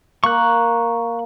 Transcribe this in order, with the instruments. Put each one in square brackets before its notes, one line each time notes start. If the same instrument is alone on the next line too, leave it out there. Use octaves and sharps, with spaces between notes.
[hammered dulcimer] A#3 [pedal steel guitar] C#6 F#6